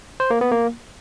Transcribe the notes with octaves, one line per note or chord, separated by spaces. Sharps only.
C5
A#3
B3
A#3